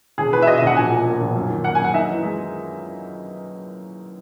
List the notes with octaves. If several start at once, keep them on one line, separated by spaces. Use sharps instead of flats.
E1 G#4
E2 B4
E5
B2 D#5
E5
E1 F#5
A#1 G#5
A#2
A#3
A#1
F#2
D#3
A#3 F#5
G#5
F#2
F#5
D#4 E5
E3
G#3